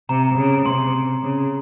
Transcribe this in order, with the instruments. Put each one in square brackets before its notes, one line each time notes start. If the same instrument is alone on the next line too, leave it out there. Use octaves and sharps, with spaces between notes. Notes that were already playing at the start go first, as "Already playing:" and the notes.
[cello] C3 [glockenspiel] A#5
[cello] C#3
[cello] C3 [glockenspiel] C6
[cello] C#3